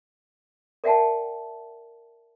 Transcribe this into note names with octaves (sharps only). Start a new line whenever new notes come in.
A#4 D5 E5 F#5 G5 A5